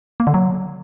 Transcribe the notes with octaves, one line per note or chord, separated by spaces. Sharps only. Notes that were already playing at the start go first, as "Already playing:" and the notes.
A#3
D3
F#3